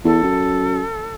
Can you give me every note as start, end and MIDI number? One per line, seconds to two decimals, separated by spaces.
0.05 0.18 40
0.05 1.14 69
0.23 0.82 42